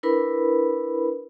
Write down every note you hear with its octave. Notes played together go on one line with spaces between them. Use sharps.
D4 E4 A#4 B4 B5